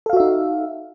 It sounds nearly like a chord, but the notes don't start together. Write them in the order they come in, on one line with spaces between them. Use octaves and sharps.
A4 F5 F#4 E5 D#4